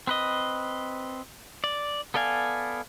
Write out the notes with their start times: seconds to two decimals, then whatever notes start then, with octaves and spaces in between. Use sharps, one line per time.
0.07 C4 B4 D#5
1.64 D5
2.14 B3 A4 D5 F5 G#5